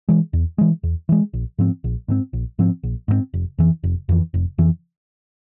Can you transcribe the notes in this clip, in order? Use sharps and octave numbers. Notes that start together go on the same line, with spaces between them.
E3 G#3
E2
E3 G#3
E2
E3 G#3
A#1
G#2 F3 C4
A#1
G#2 F3 C4
A#1
G#2 F3 C4
A#1
G#2 F3 C4
F1
F2 E3
F1
F2 E3
F1
F2 E3